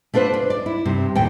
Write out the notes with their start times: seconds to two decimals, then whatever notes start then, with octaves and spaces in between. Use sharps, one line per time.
0.14 A3 D4 F4 B4 C5
0.34 D4
0.50 D5
0.66 E4
0.85 G2 C3
1.15 D#2 A2 G5